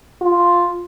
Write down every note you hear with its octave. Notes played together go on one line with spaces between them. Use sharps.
F4